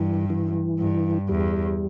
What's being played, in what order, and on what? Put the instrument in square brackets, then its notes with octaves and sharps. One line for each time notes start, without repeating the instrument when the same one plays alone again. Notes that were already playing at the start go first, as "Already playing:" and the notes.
Already playing: [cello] G2 [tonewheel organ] E3
[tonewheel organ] E3
[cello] G2
[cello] E2 [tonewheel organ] G3